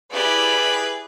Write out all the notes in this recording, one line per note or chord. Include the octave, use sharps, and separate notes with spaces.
E4 G4 G#4 B4 D5